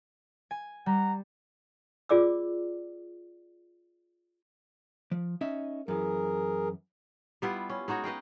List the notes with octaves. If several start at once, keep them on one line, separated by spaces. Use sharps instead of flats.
G#5
G3 F#5 A#5
F4 G#4 D5 D6 E6
F3
C#4 D#4 E5
F#2 E3 G#4 A#4
G3 B3 E4 F4
C#4
G#3 D#4 F#4 C#5
B4 D#5 F5 G5